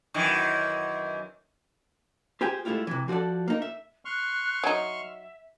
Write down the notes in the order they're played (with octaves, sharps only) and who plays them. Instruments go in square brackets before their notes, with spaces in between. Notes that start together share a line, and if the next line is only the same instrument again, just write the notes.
[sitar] F#2 D#3 E3
[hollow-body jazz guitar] F4 G4 G#4 C5 G5
G#3 A3 C#4 E4 F4 G4
C3 E3
F3 F#4 G#4 A4 D5
A#3 D#4 A#4
E5
[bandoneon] C6 C#6 F6 [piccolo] F#6
[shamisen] F#3 D#4 [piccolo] E5